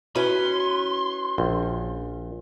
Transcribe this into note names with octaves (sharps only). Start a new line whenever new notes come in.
C#4 E4 F#4 B4 E5 B5 C6
A#1